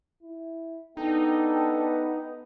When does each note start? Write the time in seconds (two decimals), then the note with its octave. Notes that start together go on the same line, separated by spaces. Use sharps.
0.22 E4
0.97 B3 D4 D#4 A4 G5